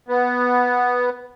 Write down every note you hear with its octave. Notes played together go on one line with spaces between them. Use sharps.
B3